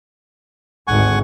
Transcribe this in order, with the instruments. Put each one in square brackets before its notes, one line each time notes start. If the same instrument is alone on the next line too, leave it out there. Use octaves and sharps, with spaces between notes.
[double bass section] G#1 D2 G#2 [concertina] F#5 G#5 C#6